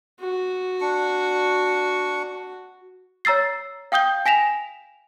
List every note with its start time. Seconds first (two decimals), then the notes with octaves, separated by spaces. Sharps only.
0.21 F#4
0.81 D4 C#6
3.25 C#5 A#5 E6 A6 C7
3.92 F5 G5 D#6 G6 G7
4.26 G#5 A#6 B6 E7 F7